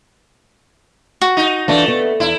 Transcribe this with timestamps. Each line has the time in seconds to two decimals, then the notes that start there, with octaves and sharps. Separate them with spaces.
1.22 F#4
1.37 D#4
1.68 E3 A3 D4 F4
1.88 B3
2.20 E2 E4